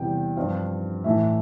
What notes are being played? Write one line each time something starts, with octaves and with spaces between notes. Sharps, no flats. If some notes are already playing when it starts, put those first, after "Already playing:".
Already playing: E2 C3 G3 G5
G2 F3 C4 F5
A2 E3 A3 E5